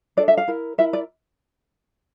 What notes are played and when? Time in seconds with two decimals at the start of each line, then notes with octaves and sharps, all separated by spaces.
0.17 D4 A4 D5
0.28 E5
0.38 F5
0.48 E4 A#4
0.78 E4 A#4 E5
0.93 D5